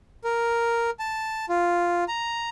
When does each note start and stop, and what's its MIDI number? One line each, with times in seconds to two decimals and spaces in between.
0.24 0.90 70
0.99 1.45 81
1.49 2.04 65
2.08 2.50 82